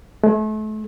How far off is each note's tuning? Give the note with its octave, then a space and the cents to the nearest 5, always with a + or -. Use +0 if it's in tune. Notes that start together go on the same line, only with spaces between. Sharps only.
A3 -35